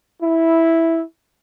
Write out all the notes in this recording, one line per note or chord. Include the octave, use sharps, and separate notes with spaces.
E4